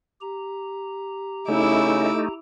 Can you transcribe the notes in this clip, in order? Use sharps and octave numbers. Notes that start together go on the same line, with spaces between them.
G4 A#5
C#3 A3 D#4 E4 D6 E6